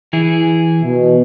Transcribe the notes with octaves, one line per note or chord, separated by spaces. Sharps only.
E3 E4 G#4
B2